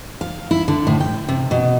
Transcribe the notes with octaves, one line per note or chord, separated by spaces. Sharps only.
F5
E4
D3
A2
G5
C3
B2